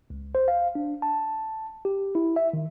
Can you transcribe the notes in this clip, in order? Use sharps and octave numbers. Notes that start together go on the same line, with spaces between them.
C#2
C5
F5
D4
A5
G4
E4
E5
D#3